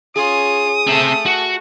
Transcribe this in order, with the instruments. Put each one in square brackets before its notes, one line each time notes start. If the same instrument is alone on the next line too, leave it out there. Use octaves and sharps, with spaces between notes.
[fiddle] C#4 F4 [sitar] G#4 [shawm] D#6
[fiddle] A3 A4 [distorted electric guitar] C4 E5
[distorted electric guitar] F#4